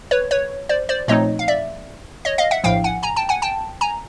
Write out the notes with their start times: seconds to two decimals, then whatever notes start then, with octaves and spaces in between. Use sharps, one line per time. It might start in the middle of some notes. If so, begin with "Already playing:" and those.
0.11 B4 C#5
0.31 B4 C#5
0.69 C5 D5
0.89 C5 D5
1.08 A#2 F3 A3 C4 D#4 C#5 D#5
1.39 F5
1.48 D5 E5
2.25 C#5 D#5
2.38 D#5 F5
2.51 E5 F#5
2.64 A#1 A2 F3 F5 G5
2.84 F#5 G#5
3.03 G#5 A#5
3.16 G5 A5
3.29 F#5 G#5
3.42 G5 A5
3.81 G#5 A#5